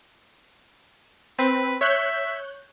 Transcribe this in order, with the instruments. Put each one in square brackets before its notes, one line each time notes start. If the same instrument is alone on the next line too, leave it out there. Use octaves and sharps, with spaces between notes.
[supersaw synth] C4 [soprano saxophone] B4
[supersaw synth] C#5 F#6 G6 [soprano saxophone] E5